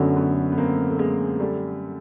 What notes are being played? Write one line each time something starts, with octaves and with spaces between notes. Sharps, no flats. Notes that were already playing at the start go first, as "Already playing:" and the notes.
Already playing: F#2 D3 F#3 A3 B3
A3 B3
B3
A#3 C4
A3
G#3 A#3
G3 A3